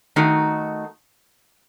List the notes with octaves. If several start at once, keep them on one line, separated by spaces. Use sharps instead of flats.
D#3 A3 D#4 F#4